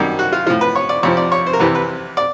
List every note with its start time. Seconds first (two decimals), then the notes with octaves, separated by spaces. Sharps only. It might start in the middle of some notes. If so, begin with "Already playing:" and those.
Already playing: F#2 D#3 G3
0.19 F#4
0.32 F4
0.47 A2 F3 F4
0.61 B4
0.75 C#5
0.89 D5
1.03 F2 C3 F3 C#5
1.17 D5
1.32 C#5
1.46 C5
1.53 A#4
1.59 E2 C3 E3 B4
1.75 B4
2.17 D5